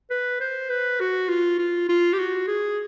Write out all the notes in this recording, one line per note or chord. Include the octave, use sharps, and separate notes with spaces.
B4
C5
B4
F#4
F4
F4
F4
G4
F#4
G#4